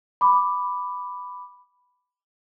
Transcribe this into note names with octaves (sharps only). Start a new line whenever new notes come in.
B5 D6